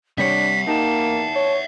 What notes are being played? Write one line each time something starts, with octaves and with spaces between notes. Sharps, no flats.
C3 G3 D4 C#5 E5 F#5 B6
A#3 D#4 G4 A5
C#5